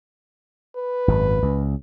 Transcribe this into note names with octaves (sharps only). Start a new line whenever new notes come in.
B4
G#1 F#2
C#2